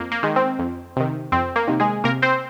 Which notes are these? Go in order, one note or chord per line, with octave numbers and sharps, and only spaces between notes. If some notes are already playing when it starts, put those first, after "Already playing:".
Already playing: F2 A#3
A#3
D#3 G#3
C4
F2
C3 D#3
F2 C4
A#3
C3 D#3
G#3 G#4
C3 A#3 A#4
C4 C5